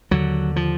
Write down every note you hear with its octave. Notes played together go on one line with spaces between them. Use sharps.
D#2 D3 F#3
F3